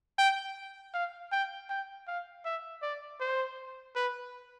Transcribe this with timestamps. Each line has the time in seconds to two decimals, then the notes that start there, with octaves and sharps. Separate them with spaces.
0.18 G5
0.94 F5
1.32 G5
1.70 G5
2.07 F5
2.45 E5
2.82 D5
3.20 C5
3.96 B4